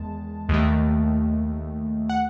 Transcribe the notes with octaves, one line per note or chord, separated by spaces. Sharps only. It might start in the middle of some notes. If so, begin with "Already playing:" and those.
Already playing: E2 D#3 G#3 A5
D#2 D#3 A3
F#5